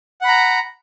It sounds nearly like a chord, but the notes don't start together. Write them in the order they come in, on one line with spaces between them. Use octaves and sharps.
F#5 B5 A#5